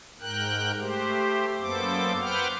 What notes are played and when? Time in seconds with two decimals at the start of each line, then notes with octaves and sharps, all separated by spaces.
0.21 G#2 A#4 G5 F#6
0.80 A3 G4 C5
1.60 F#2 A#3 B3 A4 C5 D6
2.21 B4 C5 F#5 G5 D6 F6